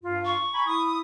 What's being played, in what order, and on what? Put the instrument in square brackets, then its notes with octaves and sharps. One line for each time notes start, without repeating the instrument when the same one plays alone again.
[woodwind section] G2 F4
[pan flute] C#6
[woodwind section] G#5 A#5 B5
E4 B5 D#6